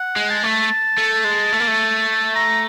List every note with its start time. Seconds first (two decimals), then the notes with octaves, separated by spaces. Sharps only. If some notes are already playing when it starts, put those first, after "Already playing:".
Already playing: F#5
0.16 G#3
0.29 A5
0.43 A3
0.98 A3
1.25 G#3
1.53 A3
1.60 A#3
1.68 A3
2.35 A#5